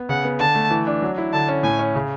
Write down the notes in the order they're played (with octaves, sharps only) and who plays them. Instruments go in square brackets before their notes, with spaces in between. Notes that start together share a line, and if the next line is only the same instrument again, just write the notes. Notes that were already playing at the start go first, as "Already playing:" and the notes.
Already playing: [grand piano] B3
[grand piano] C#3 [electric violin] F#5
[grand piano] B3
[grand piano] D3 [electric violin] A5
[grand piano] A3
E3
D4
F#3
E4
[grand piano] D3 [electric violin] A5
[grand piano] C#4
[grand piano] A2 [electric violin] G#5
[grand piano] C#4
C#3